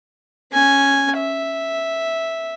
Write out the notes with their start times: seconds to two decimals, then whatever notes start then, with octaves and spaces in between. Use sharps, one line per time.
0.52 C#4 G#5
1.16 E5